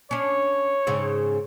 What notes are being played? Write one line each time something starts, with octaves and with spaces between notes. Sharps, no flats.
C#4 D4 C#5
G#2 C#3 C4